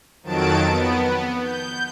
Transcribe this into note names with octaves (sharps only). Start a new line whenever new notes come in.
F2 D#3 F#3 A5 D7
B3
G6